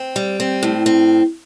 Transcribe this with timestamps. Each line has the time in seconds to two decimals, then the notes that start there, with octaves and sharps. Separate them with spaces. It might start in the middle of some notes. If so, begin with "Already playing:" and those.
Already playing: C4
0.16 G3
0.40 C4
0.63 A2
0.86 C4